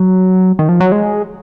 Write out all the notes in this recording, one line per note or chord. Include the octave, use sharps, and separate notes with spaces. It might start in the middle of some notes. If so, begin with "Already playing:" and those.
Already playing: F#3
D#3
F3
F#3
G#3